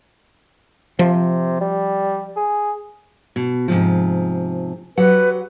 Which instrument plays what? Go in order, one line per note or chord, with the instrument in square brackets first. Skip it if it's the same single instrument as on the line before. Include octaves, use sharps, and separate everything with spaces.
[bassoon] C3 [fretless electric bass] F3
[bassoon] G3
G#4
[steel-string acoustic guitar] B2
G#2 C3 F3
[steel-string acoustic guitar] F#3 G4 F#5 [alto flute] B4